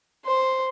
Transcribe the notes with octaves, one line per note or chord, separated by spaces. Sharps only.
C5